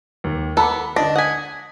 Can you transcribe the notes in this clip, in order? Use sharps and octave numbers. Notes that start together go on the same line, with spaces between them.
D#2
B3 A4 F#5 A#5 B5 D6
D3 D4 D#5 A#6
F#5 G#5 D#6 B6